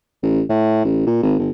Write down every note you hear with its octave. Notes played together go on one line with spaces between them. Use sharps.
A1
A2
A1
A#2
G#1
G1